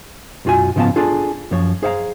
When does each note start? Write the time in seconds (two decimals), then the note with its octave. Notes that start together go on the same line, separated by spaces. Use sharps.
0.45 B1 F#2 F4 F#4 G#5
0.76 G#2 C#3 F3 B3 F5 A5
0.96 D4 F4 G#4 A4
1.51 F#2 F3 C#5
1.83 G#4 C5 F5 F#5 A#5